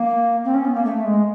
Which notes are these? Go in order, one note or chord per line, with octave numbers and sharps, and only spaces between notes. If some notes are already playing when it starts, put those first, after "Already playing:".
Already playing: A#3
C4
C#4
B3
A#3
A3
G#3